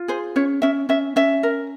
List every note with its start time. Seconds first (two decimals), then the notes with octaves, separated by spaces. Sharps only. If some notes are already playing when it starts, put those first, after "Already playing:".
Already playing: F4
0.08 G#4 C5
0.36 C#4 C#5
0.62 C#4 E5
0.89 C#4 E5
1.16 C#4 E5
1.43 A#4